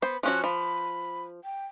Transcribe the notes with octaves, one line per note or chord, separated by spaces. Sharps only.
B3 C5 B5
F3 C#4 F#4 F#6
F3 B5
G5